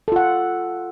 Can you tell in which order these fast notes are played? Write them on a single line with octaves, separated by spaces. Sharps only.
A4 F4 F#5